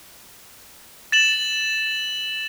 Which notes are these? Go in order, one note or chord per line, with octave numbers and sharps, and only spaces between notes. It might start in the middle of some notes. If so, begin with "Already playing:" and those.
A6 E7 F#7